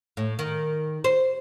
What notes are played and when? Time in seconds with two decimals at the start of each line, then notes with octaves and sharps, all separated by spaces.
0.17 A2
0.39 D#3
1.04 C5